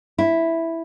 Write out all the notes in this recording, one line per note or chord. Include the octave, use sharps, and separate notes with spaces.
E4